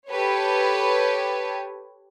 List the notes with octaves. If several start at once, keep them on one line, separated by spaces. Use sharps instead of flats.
G4 A4 B4 C#5